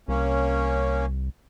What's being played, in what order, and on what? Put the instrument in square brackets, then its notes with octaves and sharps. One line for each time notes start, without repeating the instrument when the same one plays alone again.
[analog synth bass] C2 [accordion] A#3 C#4